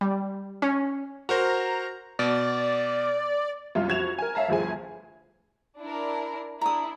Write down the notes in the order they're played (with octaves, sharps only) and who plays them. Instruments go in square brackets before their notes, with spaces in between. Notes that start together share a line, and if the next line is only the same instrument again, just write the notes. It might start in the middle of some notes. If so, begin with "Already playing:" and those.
[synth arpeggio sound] G3
C#4
[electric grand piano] F#4 A#4 C5 [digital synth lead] A#5
[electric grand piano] B2 [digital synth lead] D5
[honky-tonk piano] C2 F#2 F4
F2 F#4 G#6 E7 F7
A#4 G#5
C#5 E5 F5 A5 A#5
G1 D2 F3 E4 G#4 G#5
[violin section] D4 E4 A#4
[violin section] D4 E4 [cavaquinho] A#5 D#6